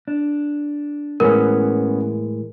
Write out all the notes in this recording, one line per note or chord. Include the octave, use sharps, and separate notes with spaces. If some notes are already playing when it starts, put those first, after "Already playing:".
D4
A2 E3 G#3 B3 C#4 A#4